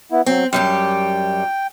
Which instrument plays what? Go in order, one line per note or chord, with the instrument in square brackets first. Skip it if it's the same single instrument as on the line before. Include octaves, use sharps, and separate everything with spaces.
[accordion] B3 E4
[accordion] F#3 [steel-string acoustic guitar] C4
[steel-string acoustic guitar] F#2 G3 G4 [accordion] G5